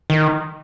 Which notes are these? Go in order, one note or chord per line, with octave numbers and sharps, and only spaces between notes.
D#3